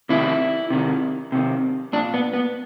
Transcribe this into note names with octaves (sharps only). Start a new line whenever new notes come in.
C3 D#3 E4
C3 D#3
C3 D#3
A#2 D4
B3
B3